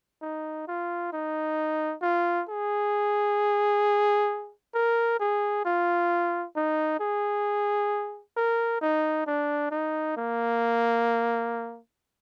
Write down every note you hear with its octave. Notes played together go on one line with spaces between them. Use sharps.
D#4
F4
D#4
F4
G#4
A#4
G#4
F4
D#4
G#4
A#4
D#4
D4
D#4
A#3